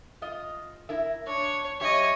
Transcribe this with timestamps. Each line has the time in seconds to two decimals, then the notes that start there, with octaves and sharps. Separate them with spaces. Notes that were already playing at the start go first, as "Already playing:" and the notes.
0.22 F4 D#5
0.89 E4 A#4 E5
1.27 D4 C#5
1.80 F#2 G4 C#5 D#5 E5